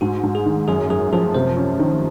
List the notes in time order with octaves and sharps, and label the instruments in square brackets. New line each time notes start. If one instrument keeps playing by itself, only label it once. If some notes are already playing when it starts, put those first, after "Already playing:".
[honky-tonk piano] G#2 [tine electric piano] F#4
[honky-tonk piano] G#2
[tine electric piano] G#4
[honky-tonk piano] D#3
[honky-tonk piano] F#2 [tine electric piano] G#4
[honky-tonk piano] F#2 [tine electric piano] G#4
[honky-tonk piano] F3 [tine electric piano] G#4
[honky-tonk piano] C3 [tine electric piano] C5
[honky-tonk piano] C#4
D#3